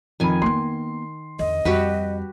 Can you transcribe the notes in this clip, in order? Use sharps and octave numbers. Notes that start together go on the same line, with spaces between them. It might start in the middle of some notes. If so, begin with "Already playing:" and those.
F2 D#3 G#5 B5
A#3 B3 C6
E2 D3 D#5
F2 G3 F#4 G4 B4